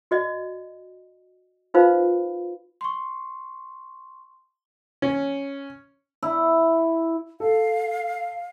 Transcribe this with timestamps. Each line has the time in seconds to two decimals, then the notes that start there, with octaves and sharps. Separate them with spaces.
0.11 F#4 D5 D#5
1.74 D#4 F4 B4 C5 F5 B5
2.81 C6 C#6
5.02 C#4
6.23 E4
7.40 A4 F5